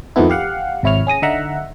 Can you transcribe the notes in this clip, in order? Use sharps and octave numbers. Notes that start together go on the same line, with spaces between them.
F2 D#3 A3 B3 E4
G4 F5 F#5
G#1 C3 E4 C#5 F6
C#4 G#4 D#6 A#6
D3 D#4 E5 F#5 A#5